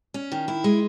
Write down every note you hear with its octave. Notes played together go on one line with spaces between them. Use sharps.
C#4
D#3
E4
G#3